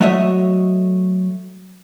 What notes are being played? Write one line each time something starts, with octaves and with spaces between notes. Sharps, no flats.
F#3 A3 F#4 C#5 D#5 E5